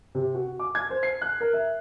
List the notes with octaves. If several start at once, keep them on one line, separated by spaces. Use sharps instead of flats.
C3
F#4
D6
G#6
C5
C7
F#6
A#4
E5